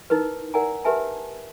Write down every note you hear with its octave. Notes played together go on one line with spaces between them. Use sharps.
D#4 E4 A#4 B4
A#4 D5 F#5 G#5 A#5
G4 A#4 B4 E5 G#5 A5